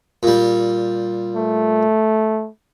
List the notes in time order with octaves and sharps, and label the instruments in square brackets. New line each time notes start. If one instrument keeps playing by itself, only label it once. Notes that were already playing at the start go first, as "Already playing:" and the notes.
[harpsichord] A#2 G3
[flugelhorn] A3